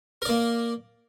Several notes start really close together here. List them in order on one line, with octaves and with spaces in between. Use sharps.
A#4 D5 A#3